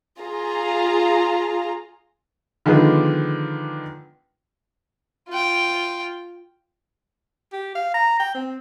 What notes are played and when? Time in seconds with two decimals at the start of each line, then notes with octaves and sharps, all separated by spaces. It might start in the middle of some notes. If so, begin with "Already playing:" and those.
0.20 F4 G#4 A#5
2.66 D3 D#3 F3 G#3 B3 D4
5.29 F4 G5
7.53 G4
7.75 F5
7.94 A#5
8.19 G5
8.34 C4